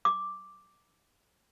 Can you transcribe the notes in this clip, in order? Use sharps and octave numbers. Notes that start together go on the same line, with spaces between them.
D6